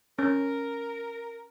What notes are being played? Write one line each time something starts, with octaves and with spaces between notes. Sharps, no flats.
C#4 A#4